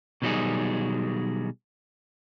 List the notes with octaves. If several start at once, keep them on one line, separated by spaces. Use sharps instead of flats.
B2 D#3 F#3 G3 D#4 G#4